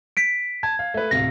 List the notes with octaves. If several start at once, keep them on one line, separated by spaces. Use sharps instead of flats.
B6 D7
A5 G#6
F5
A3 B4
D1 C3 F5 A#6